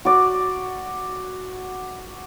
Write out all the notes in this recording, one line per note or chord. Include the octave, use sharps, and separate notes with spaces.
F#4 D5